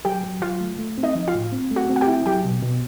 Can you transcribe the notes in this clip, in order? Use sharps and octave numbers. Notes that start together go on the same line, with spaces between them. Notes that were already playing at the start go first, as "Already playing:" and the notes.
F#3 G4 G5
F#3
F#3 F4 F5
A3
A3
C4
D#4 D#5
F3
F4 F5
A2
C4
A3
F#4 F#5
C4
F#5
G4 G5
E4
F#3 G4 G5
B2
B2